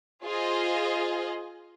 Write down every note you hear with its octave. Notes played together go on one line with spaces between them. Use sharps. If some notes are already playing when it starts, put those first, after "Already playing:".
F4 G#4 C5 D#5